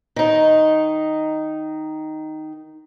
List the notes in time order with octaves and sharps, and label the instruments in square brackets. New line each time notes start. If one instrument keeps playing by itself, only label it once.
[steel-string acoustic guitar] D#3 D#4